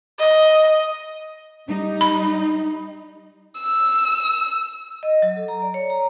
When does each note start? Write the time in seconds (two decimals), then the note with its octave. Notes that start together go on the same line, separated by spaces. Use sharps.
0.20 D#5
1.68 G3 D#4
2.01 B5
3.60 E6
5.03 D#5
5.22 F#3
5.36 A4
5.48 A#5
5.62 D5
5.74 C#5
5.90 A#5